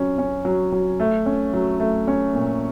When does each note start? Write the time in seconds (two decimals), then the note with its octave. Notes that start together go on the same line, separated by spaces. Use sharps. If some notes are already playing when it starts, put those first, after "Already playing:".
Already playing: F#3 C#4
0.18 C#4
0.45 F#3
0.72 F#3
1.00 A3
1.26 C#4
1.53 F#3
1.80 A3
2.07 C#4
2.35 A#2